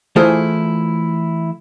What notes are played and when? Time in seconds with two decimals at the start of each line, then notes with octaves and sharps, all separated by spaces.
0.16 E3 A3 E4 F4 G#4 C5